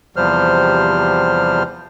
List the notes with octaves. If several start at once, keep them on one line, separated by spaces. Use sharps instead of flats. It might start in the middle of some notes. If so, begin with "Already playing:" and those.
E2 C3 F3 G3 C5 F6